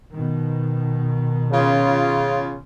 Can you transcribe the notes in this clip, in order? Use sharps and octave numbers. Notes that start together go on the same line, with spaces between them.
B2 D#3
C#3 F4